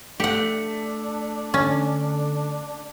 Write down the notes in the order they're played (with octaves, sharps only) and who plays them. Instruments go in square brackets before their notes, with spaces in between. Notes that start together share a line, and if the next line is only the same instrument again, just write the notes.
[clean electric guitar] A3 [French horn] D4 [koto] G4 F#5
[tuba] D3 [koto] C#4